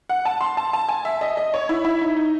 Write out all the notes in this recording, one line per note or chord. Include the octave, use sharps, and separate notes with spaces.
F#5
A5
C6
A5
A5
G#5
E5
D#5
D#5
C#5
E4
E4
D#4
D#4